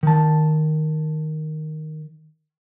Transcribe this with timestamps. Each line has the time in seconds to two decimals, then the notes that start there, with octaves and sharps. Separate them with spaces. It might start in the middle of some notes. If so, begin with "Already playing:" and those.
0.03 D#3 A5